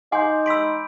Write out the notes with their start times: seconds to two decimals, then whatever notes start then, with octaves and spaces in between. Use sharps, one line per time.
0.12 D#4 F#5 G#5 C6 D6 G6
0.46 B5 C6 E6 B6 D7